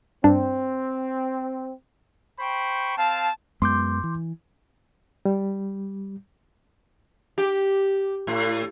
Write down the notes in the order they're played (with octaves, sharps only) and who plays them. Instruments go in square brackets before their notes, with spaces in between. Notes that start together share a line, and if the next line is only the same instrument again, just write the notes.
[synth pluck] G2 D4 [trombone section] C4
[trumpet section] C5 G5 B5 C#6
C4 F5 A5
[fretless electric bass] F#2 G#3 B3 [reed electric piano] C6 D6 G6
[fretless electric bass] E3
[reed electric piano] G3
[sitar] G4
A2